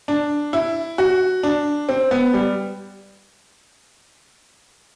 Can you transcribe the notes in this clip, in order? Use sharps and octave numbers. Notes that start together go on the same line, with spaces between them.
D4
E4
F#4
D4
C4
B3
G3